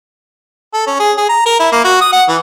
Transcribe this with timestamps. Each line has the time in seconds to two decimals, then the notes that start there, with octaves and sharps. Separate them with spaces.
0.74 A4
0.87 C#4
1.00 G#4
1.18 G#4
1.29 A#5
1.46 A#4
1.60 E4
1.72 A#3
1.85 F#4
2.01 D#6
2.13 F#5
2.29 E3